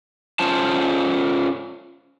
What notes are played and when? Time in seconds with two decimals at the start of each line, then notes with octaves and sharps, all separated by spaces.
0.39 C#4 F4 C5 C#5 A5